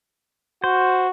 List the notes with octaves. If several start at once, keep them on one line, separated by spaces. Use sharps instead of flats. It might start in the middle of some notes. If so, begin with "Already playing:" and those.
F#4 C5